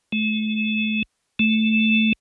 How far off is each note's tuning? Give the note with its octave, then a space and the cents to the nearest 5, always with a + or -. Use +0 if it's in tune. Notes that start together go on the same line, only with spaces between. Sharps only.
A3 -30
A3 -5